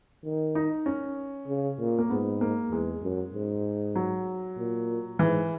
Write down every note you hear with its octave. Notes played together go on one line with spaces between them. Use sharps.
D#3
D#4
C#4
C#3
A#2
A#3
G#2 B3
A#3
E2 G#3
F#2
G#2
F#3
A#2
G#2 E3